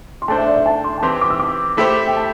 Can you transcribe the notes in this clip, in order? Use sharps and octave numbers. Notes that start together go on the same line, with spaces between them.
C6
A3 D4 C5 A5
E5
D5
E5
A5
C6
A5
E3 C4 G4 C5 C6
D6
E6
D6
A3 E4 G4 C5
G5
A5